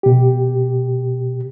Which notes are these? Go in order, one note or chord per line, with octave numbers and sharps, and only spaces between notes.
B2 G4